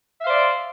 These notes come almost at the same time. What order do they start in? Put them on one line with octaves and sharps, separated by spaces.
E5 F5 C5 D5